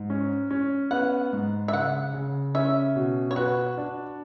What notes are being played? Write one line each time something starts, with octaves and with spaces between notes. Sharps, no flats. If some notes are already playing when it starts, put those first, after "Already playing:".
Already playing: G#2
C#4
C#4
B3 F#5
G#2
E5
C#3 F#5
C#3
C#4 E5
B2
C#5
F#4 B4
D4